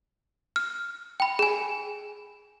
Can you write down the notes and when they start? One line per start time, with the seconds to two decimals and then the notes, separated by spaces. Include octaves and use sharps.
0.56 F6
1.20 G5 B5
1.39 G#4 G#5